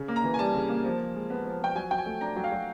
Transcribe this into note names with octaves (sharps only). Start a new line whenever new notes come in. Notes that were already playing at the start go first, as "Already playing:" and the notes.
Already playing: C#3
A#3
A#5
E3
G#5
G3 A5
C#3
A#3
F3
F3
G#3
B3
F3
F3 G5
F#3 G#5
F#3 G5
G#5
A3
D4 A#5
F#3
F5
F#3